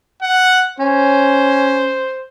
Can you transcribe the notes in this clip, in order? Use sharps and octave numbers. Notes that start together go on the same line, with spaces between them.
F#5
C#4 C5